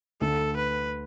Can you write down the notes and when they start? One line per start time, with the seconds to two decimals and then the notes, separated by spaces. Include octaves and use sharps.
0.21 D2 D3 A3 A4
0.56 B4